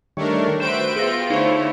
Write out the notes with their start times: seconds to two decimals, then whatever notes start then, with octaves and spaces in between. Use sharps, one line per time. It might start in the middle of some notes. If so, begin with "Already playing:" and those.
0.17 D#3 G3 A3 D4 A#4 C#5
0.60 F#4 B4 C5 E5 G5 D7 E7
0.96 B3 F4 G#4 E6 A#6
1.30 D3 A3 D#4 E4 G#4 C5 C#5